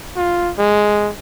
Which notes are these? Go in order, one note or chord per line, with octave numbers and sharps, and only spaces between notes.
F4
G#3